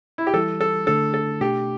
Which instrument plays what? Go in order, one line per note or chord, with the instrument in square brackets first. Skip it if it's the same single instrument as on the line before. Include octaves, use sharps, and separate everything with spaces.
[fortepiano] E4
G4
[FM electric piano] E3 G3 E4 [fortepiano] A4
[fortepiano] A4
[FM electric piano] D3 A3 D4 [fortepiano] A4
[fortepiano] A4
[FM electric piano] B2 A3 D4 [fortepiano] G4